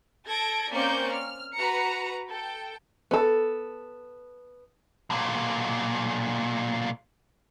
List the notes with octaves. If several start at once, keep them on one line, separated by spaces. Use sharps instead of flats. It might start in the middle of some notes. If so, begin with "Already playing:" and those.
A4 G#6 A#6 D7
A#3 C4 C#4 D5 C#6 G6
F6
F#4 B4 A#5 C#7
A4 G5
B3 A4
B1 A#2